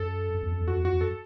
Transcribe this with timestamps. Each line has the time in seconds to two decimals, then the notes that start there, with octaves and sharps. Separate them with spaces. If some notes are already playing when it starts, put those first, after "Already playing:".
Already playing: F#2 A4
0.34 F#2
0.43 E2
0.51 F#2
0.60 E2
0.68 F#2 F#4
0.76 E2
0.84 F#2 F#4
0.92 E2
1.01 F#2 A4